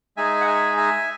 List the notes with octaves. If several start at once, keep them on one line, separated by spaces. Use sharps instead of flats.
G#3 D#4 G#4 E5 G#5
F#5
E5 G#5
E5 G#5